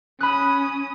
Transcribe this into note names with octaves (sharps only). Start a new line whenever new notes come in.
C#4 B5 D#6 F#6